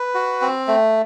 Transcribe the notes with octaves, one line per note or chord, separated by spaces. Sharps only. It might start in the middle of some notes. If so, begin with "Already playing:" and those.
Already playing: B4
F#4
C4
A3